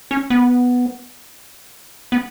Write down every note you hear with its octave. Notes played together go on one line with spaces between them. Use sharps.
C#4
B3
B3